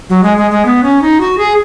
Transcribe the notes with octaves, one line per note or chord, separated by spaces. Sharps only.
F#3
G#3
G#3
G#3
B3
C#4
D#4
F#4
G#4